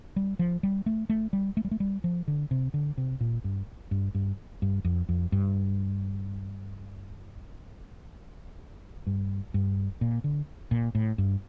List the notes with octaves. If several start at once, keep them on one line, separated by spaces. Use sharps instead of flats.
G3
F3
G3
A3
A3
G3
A3
G3
A3
G3
F3
D3
C3
D3
C3
A#2
G2
G2
G2
G2
F2
F2
G2
G2
G2
A#2
D3
A#2
A2
G2